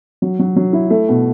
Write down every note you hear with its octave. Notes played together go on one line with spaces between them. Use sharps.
F#3
F#3
F#3
E4
A3
B2